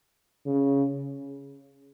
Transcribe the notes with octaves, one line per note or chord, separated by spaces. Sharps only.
C#3